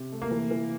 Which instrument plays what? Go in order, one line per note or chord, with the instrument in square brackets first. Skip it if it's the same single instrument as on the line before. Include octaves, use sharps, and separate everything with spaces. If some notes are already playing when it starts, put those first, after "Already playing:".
Already playing: [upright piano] C3
A3
[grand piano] A#3
[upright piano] E3
E3